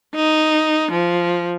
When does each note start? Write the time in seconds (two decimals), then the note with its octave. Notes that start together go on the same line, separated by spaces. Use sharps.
0.15 D#4
0.92 F3